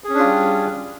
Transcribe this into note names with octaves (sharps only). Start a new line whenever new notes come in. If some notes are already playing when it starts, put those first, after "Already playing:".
G3 C#4 D4 F4 G#4